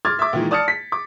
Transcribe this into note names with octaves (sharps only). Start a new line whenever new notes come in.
C6 D6 F6 G#6 A6
E5 D6
A#2 D#3 E3 G#3
D5 A5 D#6 F6 A6 C#7
B6
D6